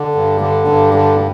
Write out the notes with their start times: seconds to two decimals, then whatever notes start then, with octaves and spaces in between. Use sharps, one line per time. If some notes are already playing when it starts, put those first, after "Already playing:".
Already playing: D3
0.15 G2
0.41 D3
0.68 G2
0.94 D3